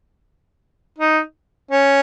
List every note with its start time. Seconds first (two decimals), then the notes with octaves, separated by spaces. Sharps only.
0.98 D#4
1.71 C#4